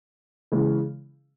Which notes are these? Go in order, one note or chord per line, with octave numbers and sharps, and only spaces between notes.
C#3 E3 G#3